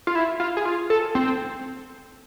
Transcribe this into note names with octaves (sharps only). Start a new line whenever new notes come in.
F4
E4
F4
G#4
F4
A4
C4